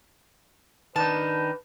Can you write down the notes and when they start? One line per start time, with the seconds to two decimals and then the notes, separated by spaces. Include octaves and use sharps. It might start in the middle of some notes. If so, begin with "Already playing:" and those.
0.96 D#3 D4 D#4 B4 A5